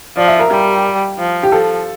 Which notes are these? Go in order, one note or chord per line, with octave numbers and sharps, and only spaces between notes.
F3 D5
E5
A#4
G3 G4
F3
G4
F3 A4